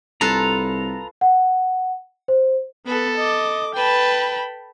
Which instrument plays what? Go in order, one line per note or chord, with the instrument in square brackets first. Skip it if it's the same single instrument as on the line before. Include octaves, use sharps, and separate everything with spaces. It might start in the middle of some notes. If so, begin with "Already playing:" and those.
[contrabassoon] C2 [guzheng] F4 A4 B4 [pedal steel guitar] A#5
[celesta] F#5
C5
[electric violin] B3 B4 [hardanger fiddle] A4
[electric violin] D#5 D6
[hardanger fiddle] B4 A5 [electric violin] G5 B5